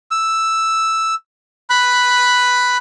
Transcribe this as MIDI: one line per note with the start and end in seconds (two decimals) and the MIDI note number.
0.11 1.14 88
1.70 2.77 83
1.70 2.77 90